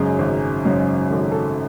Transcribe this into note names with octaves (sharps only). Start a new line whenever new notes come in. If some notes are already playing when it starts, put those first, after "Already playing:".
Already playing: G#1 F#2 C#3 G#3 G#4
G#1
F#2 C#3 G#3
G#1 A4
G#4
A4